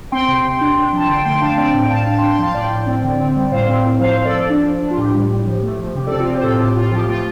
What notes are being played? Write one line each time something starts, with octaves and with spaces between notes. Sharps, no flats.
C4 G5 C6
C3
C3
D4
D4
F3 A5
D3 G5 C6
A3 G5 C6
D4 F5 A5
C4 D5 G5
A2
G5
A2 F5 A5
D4 F5 A5
G5 C6
D4 A5
G5 C6
F3 F5 A5
A2 D5 G5
A2
C4
D3
C4
G3
A2 C5 F5
C4
A2
F3 C5 F5
F3
A4 D5
F3
D4
F3
D4
F4
A2 G4
G3
A2
F3
A3
F3
C3 G4
C4 A4 D5
F4
C4 G4
C5
A2 F4 A4
A2 G4
A2 F4
F3 G4
A3 F4